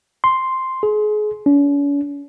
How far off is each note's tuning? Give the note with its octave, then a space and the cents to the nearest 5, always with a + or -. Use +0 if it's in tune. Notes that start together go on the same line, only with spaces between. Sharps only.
C6 +0
G#4 +30
C#4 +45